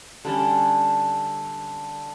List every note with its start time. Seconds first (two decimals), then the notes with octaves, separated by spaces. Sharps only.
0.25 D3 G3 C#4